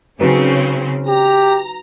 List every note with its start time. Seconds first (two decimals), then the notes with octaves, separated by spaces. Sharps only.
0.21 C#3 F#3 C4 C#4 D#4 B4
1.08 G4 A#5